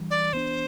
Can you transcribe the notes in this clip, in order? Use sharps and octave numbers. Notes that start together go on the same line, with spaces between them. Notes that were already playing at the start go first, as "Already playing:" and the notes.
Already playing: E3 G3 D4
D5
E3 B3 D4 C5